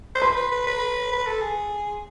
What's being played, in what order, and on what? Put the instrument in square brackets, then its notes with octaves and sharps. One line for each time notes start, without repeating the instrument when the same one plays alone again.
[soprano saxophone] C5
[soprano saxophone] B4 [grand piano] C6
[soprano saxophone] B4
B4
B4
B4
A4
G#4